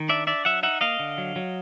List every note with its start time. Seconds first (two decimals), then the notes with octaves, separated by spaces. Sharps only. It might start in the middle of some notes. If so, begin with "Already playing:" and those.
Already playing: D#3
0.09 D4 D5 E5
0.27 D4 D5 E5
0.45 F#3 E5 F#5
0.63 D#4 E5 F#5
0.81 A#3 D#5 F5
0.99 D3
1.18 F#3
1.36 F#3